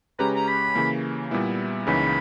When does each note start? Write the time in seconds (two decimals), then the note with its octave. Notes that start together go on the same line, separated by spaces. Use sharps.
0.19 C#3 G#3 C#4 G4 B4 A#5
0.36 A#5
0.48 B5
0.75 C#3 E3 A#3
1.31 A#2 G3 B3 E4
1.87 C#2 C#3 E3 A#3 D#4 B5